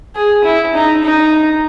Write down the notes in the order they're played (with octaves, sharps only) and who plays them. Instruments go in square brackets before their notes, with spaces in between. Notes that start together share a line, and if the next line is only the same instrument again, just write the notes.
[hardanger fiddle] G#4
E4
D#4
D#4